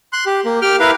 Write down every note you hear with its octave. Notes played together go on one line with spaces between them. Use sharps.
C6 F#6
G4
A#3
G4 G5 F6
E4 A#4 B4 F5